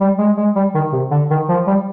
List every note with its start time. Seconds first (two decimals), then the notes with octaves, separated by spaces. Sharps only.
0.01 G3
0.18 G#3
0.37 G#3
0.55 G3
0.74 D#3
0.92 C3
1.11 D3
1.30 D#3
1.49 F3
1.67 G3